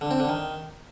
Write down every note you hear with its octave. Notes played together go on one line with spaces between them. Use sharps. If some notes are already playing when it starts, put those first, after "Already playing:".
D3
C4
D3
D#3